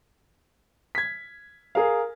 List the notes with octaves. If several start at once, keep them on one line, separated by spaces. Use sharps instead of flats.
G#6 B6
G#4 A#4 F5